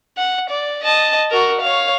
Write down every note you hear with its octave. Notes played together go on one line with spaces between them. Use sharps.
F#5
D5
D#5 A5
F#4 A#4
C#5 F5